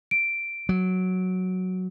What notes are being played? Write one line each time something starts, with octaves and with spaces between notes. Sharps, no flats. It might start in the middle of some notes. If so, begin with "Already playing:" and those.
D7
F#3